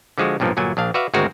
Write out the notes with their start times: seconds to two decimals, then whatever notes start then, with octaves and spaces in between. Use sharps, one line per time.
0.18 D3 F3 G#3 F#4
0.40 B1 G2 A#2 F3
0.57 G1 A#2 F#3 G#5
0.77 A#1 D4 F5
0.94 F#4 B4 D5 E5 F5
1.14 G#1 D2 G#3 C4 F#4 A#4